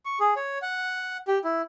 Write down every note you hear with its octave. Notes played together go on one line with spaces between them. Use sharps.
C#6
G#4
C#5
F#5
G4
E4